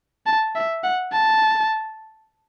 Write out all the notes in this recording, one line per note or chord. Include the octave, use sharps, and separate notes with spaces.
A5
E5
F#5
A5